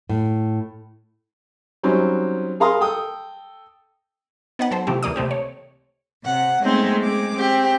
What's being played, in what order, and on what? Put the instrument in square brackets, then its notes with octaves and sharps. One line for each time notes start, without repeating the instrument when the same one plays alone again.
[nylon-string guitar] A2
[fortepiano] F#3 G3 C4 C#4 D#4
G#4 A#4 F5 A#5 C6 D#6
A4 G5 D#6
[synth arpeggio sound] B3 D#4 B4 F#5
F#3 A4 C5
C3 E3 F3 A3 C4 G4
C#2 E3 A#3 D5 D#6
C3 A3 C4 G4
C#5
[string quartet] C3 F#5
G#3 A3 B3 C4 D#4 C5
G#3 C4 D6
C4 G4